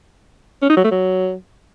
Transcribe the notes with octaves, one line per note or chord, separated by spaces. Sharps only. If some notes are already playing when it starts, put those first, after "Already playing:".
C#4
D#4
F#3
A3
F#3